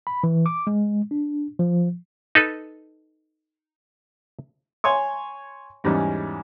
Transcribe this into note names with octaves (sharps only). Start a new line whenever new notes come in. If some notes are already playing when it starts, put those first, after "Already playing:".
B5
E3
D6
G#3
D4
F3
D#4 A4 B4
C#5 G#5 C6 C#6
E2 G#2 G3 C#4